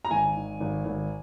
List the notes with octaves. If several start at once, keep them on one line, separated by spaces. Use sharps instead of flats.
A#5
G#1 G#5
D#3
G#1
G#1